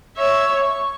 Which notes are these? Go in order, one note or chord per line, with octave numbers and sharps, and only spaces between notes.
C#5 E5
C#6